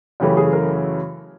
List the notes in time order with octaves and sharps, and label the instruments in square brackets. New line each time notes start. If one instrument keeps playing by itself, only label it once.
[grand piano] F#2 C#3 E3 A3 C#4 G4
G#4
A#4